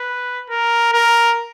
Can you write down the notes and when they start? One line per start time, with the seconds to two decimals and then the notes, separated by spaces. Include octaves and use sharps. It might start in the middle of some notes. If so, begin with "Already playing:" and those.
Already playing: B4
0.50 A#4
0.93 A#4